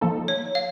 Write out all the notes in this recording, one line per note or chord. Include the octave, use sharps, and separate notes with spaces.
F3 A#3 D#4 A4
C#5
F5